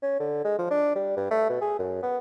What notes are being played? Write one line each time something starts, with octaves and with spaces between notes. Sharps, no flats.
C#4
D3
G#3
F3
D4
G3
G2
A3
B2
G#4
F#2
B3